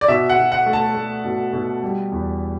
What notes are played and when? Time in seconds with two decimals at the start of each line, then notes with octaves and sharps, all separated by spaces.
0.01 D5
0.08 B2 E5
0.29 F#5
0.37 B2
0.52 F#5
0.66 A3
0.73 A5
0.95 A3
1.25 B2
1.53 B2
1.83 G3
2.12 E2